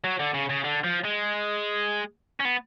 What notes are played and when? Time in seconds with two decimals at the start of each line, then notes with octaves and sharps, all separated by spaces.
0.04 F#3
0.19 D3
0.34 C#3
0.50 C#3
0.64 D3
0.84 F3
1.05 G#3
2.40 C#4
2.45 B3